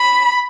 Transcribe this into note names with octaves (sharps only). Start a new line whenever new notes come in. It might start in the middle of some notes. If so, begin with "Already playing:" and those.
Already playing: B5